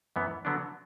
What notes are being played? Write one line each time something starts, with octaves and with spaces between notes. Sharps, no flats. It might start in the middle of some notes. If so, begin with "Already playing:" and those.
F#2 E3 B3
D3 F#3 B3 D4